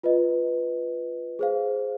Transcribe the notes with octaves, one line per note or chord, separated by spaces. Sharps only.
F4 B4 D#5
G#4 C5 F5